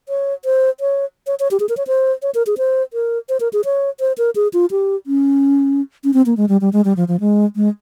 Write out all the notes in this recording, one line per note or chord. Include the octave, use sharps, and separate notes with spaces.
C#5
C5
C#5
C#5
C#5
G4
G#4
A#4
C#5
C5
C#5
A#4
G#4
C5
A#4
C5
A#4
G#4
C#5
C5
A#4
G#4
F4
G4
C#4
C#4
C4
A#3
G#3
G3
G3
G#3
G3
F3
F3
G#3
G#3